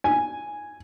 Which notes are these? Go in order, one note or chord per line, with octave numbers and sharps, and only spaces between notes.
G#5